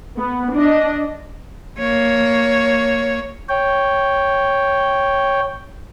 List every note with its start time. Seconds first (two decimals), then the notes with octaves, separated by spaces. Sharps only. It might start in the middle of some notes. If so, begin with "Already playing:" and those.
0.18 B3
0.54 D4 D#5
1.79 A#3 C#5
3.49 C#5 G5